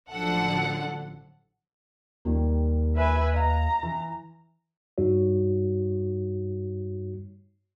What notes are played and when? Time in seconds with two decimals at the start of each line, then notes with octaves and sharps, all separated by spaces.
0.11 A1 D3 F3 F#3 A4 F#5
2.25 D#2 D#3 G3 A#3
2.96 B4 E5 G#5
3.33 D#5 F5 A#5
3.83 E3
4.98 G2 G3 D#4 F#4 C#5